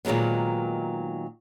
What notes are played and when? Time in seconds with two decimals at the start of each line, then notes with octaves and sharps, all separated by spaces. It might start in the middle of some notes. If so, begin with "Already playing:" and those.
0.05 A#2 D#3 F#3 G#3 B3